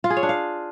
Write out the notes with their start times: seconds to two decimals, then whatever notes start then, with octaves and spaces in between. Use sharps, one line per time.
0.04 F4
0.10 G#4
0.17 C#5
0.23 D4
0.29 F5